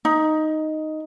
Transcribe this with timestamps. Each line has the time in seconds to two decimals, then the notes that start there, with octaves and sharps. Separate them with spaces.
0.05 D#4